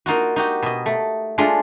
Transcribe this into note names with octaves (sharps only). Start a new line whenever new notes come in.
A#3 D#4 F4 F#4
D#4 F#4 G4
B2 D#5
A3
G#3 A3 D4 F4